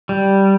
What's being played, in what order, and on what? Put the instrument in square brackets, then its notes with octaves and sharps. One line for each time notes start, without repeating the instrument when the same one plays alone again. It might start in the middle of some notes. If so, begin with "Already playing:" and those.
[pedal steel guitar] G3